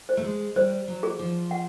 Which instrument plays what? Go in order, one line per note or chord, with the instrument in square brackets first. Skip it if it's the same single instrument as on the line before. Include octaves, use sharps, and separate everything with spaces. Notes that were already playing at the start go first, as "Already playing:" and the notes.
[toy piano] C5
[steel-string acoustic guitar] A3
G#3
[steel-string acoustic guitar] G3 [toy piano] C5
[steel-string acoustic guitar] F#3
[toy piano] G#4
[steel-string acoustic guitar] F3
[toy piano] F#5